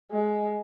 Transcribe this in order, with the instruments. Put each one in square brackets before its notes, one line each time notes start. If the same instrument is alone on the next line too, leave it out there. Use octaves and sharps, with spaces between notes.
[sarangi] G#3